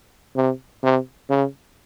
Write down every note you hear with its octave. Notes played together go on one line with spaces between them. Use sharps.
C3
C3
C#3